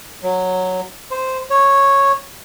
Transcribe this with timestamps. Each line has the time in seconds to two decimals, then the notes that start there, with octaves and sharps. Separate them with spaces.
0.23 F#3
1.11 C5
1.50 C#5